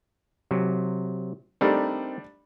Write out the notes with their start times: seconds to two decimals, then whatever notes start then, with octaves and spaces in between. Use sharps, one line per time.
0.51 C3 F#3
1.61 G3 A3 C4 D4 D#4 A#4